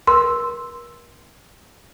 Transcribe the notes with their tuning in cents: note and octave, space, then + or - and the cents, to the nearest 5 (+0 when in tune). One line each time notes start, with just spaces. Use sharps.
A#4 +40 C6 +0 E6 +0